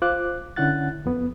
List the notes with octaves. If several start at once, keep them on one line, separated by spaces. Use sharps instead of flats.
F4 C5 D6 F#6
D3 C#4 E4 F#5 F#6 A6
F2 B3